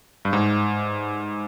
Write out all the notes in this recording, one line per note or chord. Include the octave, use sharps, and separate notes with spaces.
G2
G#2